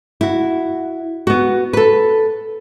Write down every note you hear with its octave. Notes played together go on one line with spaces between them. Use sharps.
E4 F#4
B3 F#4
A4 B4